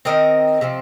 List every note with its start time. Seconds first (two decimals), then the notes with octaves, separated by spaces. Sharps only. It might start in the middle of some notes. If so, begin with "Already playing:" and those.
0.05 D#3 C4 A#4 D#5
0.61 C3 F3 C4